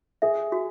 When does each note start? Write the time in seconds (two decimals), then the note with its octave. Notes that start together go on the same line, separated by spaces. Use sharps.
0.22 G#4 E5
0.52 F#4